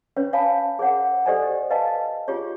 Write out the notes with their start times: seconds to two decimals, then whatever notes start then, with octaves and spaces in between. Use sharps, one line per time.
0.17 C#4 B4 C#5
0.33 C#5 F5 G#5 A5 B5
0.79 G#4 A#4 C#5 F#5
1.26 G4 A4 C5 D5 D#5 G#5
1.70 B4 D#5 F5 G#5 A5
2.28 F4 G4 G#4 C#5